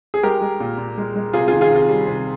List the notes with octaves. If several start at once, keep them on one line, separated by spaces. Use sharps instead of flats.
G#4
G#3 G4 A#4
G#3
A#2
A#2
G#3
G#3
C3 F4 G#4
D#3 F4 G#4
F4 G#4
C3
F4
G3
C3